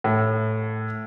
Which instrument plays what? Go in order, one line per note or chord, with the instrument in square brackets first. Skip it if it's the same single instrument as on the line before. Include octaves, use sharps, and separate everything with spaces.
[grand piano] A2